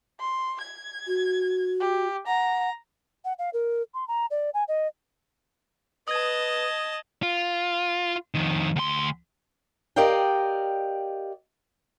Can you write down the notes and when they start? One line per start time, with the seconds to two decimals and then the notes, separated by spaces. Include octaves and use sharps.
0.20 C6
0.61 G#6
1.07 F#4
1.80 G4
2.27 F#5 A#5
3.24 F#5
3.39 F5
3.53 A#4
3.94 C6
4.08 A#5
4.31 D5
4.54 G#5
4.68 D#5
6.08 B4 D#5 A5 D#6 G#6
7.23 F4
8.34 F2 D#3
8.76 D2 C6
9.96 G4 A#4 D5 D#5 F5 G5